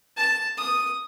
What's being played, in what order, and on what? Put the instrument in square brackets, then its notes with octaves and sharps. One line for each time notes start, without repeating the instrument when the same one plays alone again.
[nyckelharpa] A5
D#6